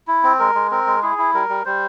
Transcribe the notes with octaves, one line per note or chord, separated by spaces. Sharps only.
E4
C4
G#3 A#4
G#3
C4 A#4
G#3
E4 G#4
E4
G3 A#4
G3
G3 C5